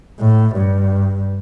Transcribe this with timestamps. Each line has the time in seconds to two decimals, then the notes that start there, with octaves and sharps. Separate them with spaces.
0.20 A2
0.56 G2